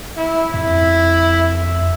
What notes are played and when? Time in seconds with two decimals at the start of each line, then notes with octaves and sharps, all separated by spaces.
0.17 E4
0.54 F2 E4 E5